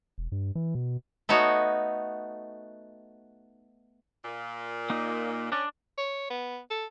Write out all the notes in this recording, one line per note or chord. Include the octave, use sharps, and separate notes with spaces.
E1
G2
E3
B2
A3 B3 D#4 F#4 C#5
A#2
A#3 D#4
C#4 D4 D5
C#5
B3
A4